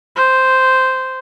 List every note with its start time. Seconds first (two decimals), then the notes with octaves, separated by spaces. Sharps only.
0.16 C5